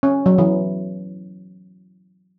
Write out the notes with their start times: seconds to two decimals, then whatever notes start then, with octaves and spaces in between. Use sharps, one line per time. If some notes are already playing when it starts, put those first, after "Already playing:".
0.03 C#4
0.26 F#3
0.38 E3